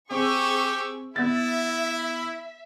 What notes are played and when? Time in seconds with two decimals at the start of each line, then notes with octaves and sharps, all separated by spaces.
0.11 C4 G4 G#4 C#6 E6
1.16 B3 E4 E5 A6